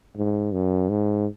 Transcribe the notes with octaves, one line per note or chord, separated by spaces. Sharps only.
G#2
F#2
G#2